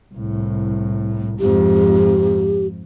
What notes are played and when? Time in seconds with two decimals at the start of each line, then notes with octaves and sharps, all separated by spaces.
0.14 C2 A2
1.40 F2 G#2 G4